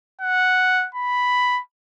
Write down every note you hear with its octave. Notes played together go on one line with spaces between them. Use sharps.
F#5
B5